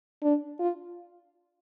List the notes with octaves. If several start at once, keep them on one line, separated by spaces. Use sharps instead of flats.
D4
F4